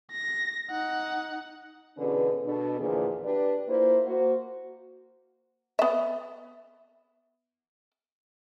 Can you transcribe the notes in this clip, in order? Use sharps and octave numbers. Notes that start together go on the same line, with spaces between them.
A#6
D#4 F#5
B2 D3 E3 C#4 G#4 B4
B2 D4 A4
E2 A#2 D3 E3 F3 G#4
D4 G4 B4 D5
A#3 E4 F4 C5
A#3 F#4 C5
B3 E5